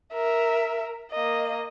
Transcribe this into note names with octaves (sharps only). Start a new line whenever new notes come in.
A#4 E5
A#3 D#5